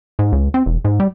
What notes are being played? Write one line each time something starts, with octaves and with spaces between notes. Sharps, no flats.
G#2
C#2
C4
E1
G#2
G3